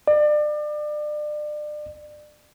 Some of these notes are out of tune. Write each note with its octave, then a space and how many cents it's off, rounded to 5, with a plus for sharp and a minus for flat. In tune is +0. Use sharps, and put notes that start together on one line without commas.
D5 +30